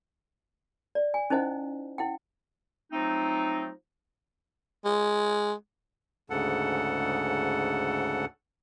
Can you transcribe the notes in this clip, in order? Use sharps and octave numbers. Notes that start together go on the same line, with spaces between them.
D5
G#5
C#4 D#4 E4 C5 D#5 F#5
E4 F#5 G5
F3 F#3 A3 C4 D#4
G#3
D2 G#2 C#3 A4 F#5